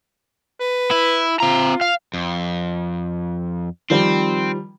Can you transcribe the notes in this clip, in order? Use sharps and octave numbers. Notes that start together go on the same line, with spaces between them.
B4
E4
C4 F4 A#5
F5
F2
D#3 F3 G3 C4